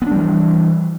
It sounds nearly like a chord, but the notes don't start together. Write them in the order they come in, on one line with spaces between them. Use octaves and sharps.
B3 D4 G3 E3